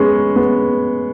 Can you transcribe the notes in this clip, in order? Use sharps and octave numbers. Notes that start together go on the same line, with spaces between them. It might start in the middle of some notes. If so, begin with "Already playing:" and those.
Already playing: G#3 B3 C#4
B3